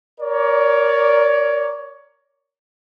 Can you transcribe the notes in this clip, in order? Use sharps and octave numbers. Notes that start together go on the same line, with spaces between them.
A#4 C#5 D5